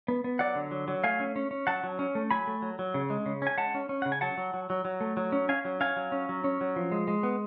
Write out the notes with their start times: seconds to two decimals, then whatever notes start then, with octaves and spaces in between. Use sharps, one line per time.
0.08 B3
0.24 B3
0.39 F#3 D5 F#5
0.55 D3
0.71 F#3
0.88 F#3
1.04 A3 F5 G#5
1.20 C#4
1.36 C#4
1.51 C#4
1.67 F#3 F#5 A5
1.84 F#3
1.99 C#4
2.15 A3
2.31 F#3 G#5 B5
2.47 A3
2.62 F#3
2.79 F#3
2.94 C#3
3.10 G#3
3.26 C#3
3.42 C#4 G#5
3.57 G#3 F#5 A5
3.75 C#4
3.89 C#4
4.02 C#3 F#5
4.12 G#5
4.21 F#3 F#5 A5
4.37 F#3
4.54 F#3
4.70 F#3
4.85 F#3
5.01 A3
5.17 F#3
5.32 C#4
5.49 C#4 F5 G#5
5.65 F#3
5.81 C#4 F5 G#5
5.96 F#3
6.12 C#4
6.29 F#3
6.44 C#4
6.61 F#3
6.76 F3
6.92 G#3
7.08 G#3
7.23 B3